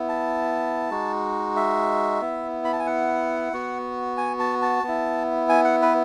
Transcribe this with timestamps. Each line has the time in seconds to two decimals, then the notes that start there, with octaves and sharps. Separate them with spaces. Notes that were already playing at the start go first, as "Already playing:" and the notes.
Already playing: B3 E4
0.09 A5
0.90 G#3 D#4 F#4
1.56 E5
2.21 B3 E4
2.65 B5
2.73 A5
2.80 G#5
2.86 F#5
3.53 B3 F#4
4.17 G#5
4.39 A5
4.62 A5
4.83 B3 E4
5.49 G#5
5.65 F#5
5.82 B4